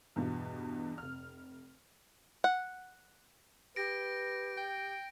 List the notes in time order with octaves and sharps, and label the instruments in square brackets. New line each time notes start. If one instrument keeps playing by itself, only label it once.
[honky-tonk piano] E2 G2 B2
F1 F6
[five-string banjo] F#5
[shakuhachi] G4 [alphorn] B4 [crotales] A#6 D7
[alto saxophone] G5